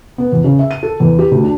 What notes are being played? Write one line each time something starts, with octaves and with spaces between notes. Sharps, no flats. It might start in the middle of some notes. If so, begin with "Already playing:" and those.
B3
E2
C#3
E5
D#7
A4
E2
G4
D2
D4